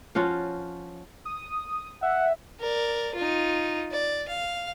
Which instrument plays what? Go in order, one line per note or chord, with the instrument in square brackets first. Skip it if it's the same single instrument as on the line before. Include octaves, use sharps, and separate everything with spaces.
[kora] F3 C#4 F4 F#4
[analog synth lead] D#6
[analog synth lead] E5 [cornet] F#5
[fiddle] A#4 D5
D#4 F4
D5
F5